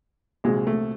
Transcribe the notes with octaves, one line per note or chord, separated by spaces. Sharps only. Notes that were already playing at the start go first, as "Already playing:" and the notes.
C2 A#2 F#3 G#3
A3